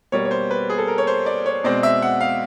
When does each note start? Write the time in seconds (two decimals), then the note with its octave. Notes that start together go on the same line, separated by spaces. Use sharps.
0.12 B2 G3 A#3 C#5
0.25 C#5
0.31 C5
0.51 B4
0.70 G#4
0.78 A4
0.88 A#4
0.98 C#5
1.07 C5
1.26 D5
1.46 C#5
1.64 B2 G#3 C4 D5
1.83 E5
2.02 F#5
2.20 F5